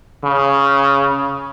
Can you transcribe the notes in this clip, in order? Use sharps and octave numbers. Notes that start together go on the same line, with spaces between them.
C#3